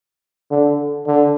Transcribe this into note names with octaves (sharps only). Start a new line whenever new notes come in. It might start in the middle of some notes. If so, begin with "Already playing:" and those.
D3
D3